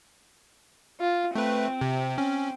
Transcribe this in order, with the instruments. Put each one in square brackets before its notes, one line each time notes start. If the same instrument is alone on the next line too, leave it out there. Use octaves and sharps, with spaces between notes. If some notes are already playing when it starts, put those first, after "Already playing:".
[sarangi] F4
[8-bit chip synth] A3 B4 [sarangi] C4
[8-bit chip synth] C3
C#4